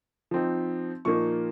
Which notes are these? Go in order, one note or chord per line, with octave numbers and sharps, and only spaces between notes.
F3 C4 D#4
A#2 F3 A#3 D#4 C#6